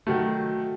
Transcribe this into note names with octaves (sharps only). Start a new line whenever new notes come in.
D#3 F#3 A3